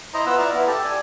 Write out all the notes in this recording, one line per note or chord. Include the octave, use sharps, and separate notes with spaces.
E4 C5 D#5 A#5
B3 F4 F#5 E6
E4 F4 D5 E5 F5 A#5
B3 E4
G4 A4 A5
D5 G#5